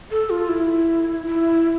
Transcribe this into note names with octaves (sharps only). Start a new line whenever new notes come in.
A4
F4
E4
E4